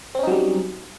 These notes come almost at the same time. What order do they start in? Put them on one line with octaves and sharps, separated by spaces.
C4 C#4 D#4 F#3 G3